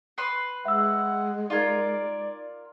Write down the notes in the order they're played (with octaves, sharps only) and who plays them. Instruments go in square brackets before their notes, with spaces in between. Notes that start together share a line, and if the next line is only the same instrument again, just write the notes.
[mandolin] B4 C6
[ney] G#3 [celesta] E5 E6 [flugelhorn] F#5
[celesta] D#4 G#6 [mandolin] F4 A#4 [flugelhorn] D5